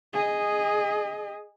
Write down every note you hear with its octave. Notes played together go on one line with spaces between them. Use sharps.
G#4 D#5